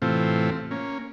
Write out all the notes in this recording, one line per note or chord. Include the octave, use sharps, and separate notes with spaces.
A2 C3 E3 A3 C4 F4
A#3 C#4